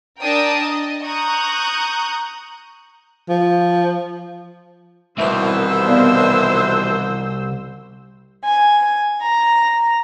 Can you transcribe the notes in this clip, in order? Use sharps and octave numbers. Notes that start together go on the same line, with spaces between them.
D4 A#4 G5 A5 D#6
D#5
A#5 C#6 D#6 F#6 G6
F3
C2 B2 D#3 E3 C5 E5 E6
B3 D5 F5
G#5
A#5